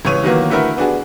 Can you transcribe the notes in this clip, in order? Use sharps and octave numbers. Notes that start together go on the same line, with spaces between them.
C#2 E3 C#5 D#7
D#3 E3 F#3 A#3 B3
D3 A3 E4 F#4 A#4 B4
B3 D4 F#4 G#4